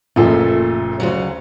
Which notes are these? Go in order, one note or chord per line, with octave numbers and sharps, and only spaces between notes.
F#1 A#2 F3 A3 A4
D2 C#3 F#3